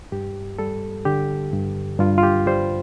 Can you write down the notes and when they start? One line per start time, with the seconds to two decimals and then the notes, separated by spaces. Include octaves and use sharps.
0.12 G2 G4
0.59 G3 A4
1.05 D3 G4
1.53 G2
1.99 G2 F4
2.18 F4
2.23 G4
2.47 G3 C5